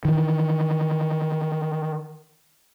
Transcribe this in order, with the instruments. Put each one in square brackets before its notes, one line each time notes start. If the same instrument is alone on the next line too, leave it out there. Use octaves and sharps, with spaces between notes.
[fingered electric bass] D#3 E3